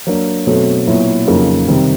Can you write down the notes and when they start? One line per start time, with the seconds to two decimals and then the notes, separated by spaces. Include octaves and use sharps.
0.07 F#3 A#3 D4
0.47 B2 F#3 A3 C4
0.87 A#2 F#3 B3 E4
1.27 F2 C#3 F#3 A#3 D#4
1.67 C3 D#3 G3 C4